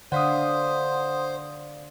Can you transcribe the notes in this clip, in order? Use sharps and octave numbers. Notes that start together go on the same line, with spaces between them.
D3 C5 D5 F5 F#5 C6 D#6